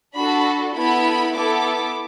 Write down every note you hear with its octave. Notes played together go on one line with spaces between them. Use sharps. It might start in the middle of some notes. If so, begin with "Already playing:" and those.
D4 F#4 A4 B5
B3 E4 A4 B5
B3 E4 A4 D6